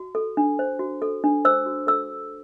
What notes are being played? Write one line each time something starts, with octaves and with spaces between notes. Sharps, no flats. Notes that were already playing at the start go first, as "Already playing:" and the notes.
Already playing: F#4
A4
D4
C5
F#4
A4
D4
C5 E6
F#4
A4 E6